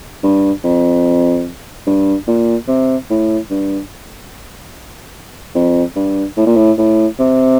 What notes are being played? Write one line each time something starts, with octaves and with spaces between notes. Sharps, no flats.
G2
F2
G2
A#2
C3
A2
G2
F2
G2
A2
A#2
A2
A2
C3